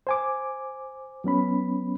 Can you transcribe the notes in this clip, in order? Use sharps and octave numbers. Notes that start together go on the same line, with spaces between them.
C5 G#5 D6
F#3 B3 C#4 B5